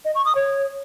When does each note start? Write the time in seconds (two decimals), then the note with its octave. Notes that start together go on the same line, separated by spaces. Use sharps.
0.05 D#5
0.15 C#6
0.25 D#6
0.35 C#5